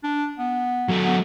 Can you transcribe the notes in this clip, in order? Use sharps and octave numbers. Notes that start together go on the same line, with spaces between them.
D4
B3
F#3 A3
B3